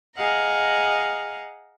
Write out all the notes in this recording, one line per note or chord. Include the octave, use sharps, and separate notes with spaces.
G#4 D#5 F5 F#5 A#5